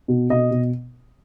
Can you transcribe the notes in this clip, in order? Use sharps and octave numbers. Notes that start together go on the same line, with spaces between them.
B2
B2 D#5
B2